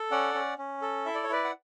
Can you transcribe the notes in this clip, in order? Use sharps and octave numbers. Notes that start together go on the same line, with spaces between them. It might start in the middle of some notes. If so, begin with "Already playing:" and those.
Already playing: A4
C#4 D5 F#5
C#4
C#4
A4
E4 E5
D5
C#5
E4 B4 D5
F#5